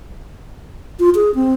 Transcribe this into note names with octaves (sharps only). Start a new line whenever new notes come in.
F4
G#4
C4